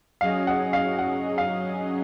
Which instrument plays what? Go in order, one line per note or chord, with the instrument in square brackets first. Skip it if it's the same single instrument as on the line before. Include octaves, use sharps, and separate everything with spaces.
[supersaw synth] F#3 C#4 G#4 D#5 [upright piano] F5
[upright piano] F#5
F5
F#5
F5